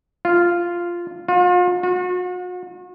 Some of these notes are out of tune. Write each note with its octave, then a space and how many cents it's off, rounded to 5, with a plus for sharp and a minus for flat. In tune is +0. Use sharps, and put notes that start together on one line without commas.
F4 -5
F4 +40
F#4 -40